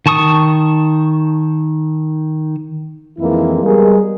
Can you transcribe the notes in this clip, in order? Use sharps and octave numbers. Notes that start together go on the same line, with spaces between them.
D#3 A5 C#6 D#6
F2 D#3 E3 G#3 A#3 E4
G3 G#3 B3 G#4 A#4